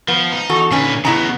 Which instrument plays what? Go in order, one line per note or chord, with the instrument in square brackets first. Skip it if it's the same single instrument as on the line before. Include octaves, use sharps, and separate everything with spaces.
[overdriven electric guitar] F3 [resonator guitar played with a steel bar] B3
[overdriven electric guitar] D#4
[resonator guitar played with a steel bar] E2 F#4 A4
[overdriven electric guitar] A#2 B4 [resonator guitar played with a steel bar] D3 C#4 D#4
[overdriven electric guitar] C#3 B3 [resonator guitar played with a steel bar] E4 D#5 A#5